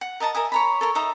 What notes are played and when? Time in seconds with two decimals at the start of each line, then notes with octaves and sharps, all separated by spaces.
0.01 F#5
0.20 A#4 D#5 A5 A#5
0.35 A#4 E5 G#5 D#6
0.52 C#5 A#5 B5
0.81 A4 A#4 C#5
0.95 D#4 E5 A#5 D#6